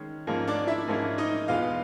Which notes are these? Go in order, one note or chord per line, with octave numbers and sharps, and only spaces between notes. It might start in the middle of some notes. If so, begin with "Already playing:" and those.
Already playing: D#3 G#3 C#4
G#2 F3 A#3 C#4 F4
D4 D5
E4 E5
G#2 F3 A#3 C#4 F4
D#4 D#5
E2 B2 G#3 B3 F4 F5